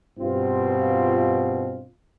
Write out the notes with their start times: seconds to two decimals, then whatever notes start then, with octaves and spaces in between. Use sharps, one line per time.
0.19 G2 B2 C4 F4